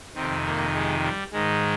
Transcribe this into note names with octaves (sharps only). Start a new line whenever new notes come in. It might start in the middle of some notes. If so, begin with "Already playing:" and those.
F2 C3 D#3 C4
A#3
G#3
G3
G#2 D#3 G#3